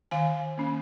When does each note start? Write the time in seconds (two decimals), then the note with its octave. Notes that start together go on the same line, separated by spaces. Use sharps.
0.11 D#3 F5 G#5
0.58 A#3 C#4